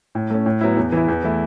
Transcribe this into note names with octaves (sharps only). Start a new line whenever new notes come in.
A2
A3 C#4
A2
F#3 B3 E4
E2
E3 B3 E4
E2
E3 A3 E4